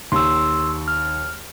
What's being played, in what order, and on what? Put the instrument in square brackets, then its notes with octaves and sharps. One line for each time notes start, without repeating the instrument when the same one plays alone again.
[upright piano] D#2 [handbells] C6 E6
[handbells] F6